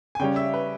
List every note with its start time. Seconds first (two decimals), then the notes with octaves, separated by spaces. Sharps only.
0.15 G#5
0.19 C#3 G3 C#4 G5
0.36 E5
0.54 B4